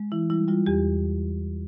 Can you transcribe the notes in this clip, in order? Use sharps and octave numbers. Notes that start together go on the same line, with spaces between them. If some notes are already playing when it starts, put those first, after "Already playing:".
Already playing: G#3
E3 E4
G3 E4
G3 F4
E2 G4